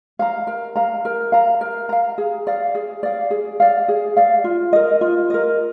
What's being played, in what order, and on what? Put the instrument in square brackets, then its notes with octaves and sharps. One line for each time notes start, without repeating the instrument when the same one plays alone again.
[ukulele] F5 A#5
A#4
F5 A#5
A#4
F5 A#5
A#4
F5 A#5
G#4
D5 F5
G#4
D5 F5
G#4
D5 F5
G#4
D5 F5
F4
A#4 D#5
F4
A#4 D#5